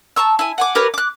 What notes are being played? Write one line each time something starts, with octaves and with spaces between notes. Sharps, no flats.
A5 A#5 C#6 E6
E4 G#5
F#5 G#5 D6
G4 A#4 B4 C#5
D6 F#6